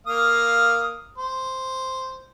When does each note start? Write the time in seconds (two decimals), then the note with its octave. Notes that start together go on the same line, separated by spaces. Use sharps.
0.07 A#3 F5 D#6
1.18 C5